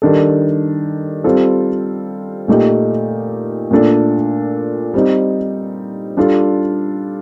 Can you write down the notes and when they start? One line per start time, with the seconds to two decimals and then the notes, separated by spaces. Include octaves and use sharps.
0.02 D#3 G3 D4 A4
1.24 G3 C4 F4 A4
2.48 A#2 A3 D#4 G4
3.71 A#2 A3 D4 A4
4.94 G3 C4 D#4
6.17 G3 D4 F4 A4